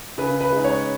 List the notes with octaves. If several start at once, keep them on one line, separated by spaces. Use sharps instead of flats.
C#3 B4
B4
G#3 D#4
C#5